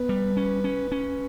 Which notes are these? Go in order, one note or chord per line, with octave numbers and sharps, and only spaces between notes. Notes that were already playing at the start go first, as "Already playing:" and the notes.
Already playing: B3 B4
G3
C#4
C#4
C#4